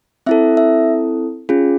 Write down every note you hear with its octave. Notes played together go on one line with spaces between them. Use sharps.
C4 E4 A4 E5
E5
C#4 F4 G#4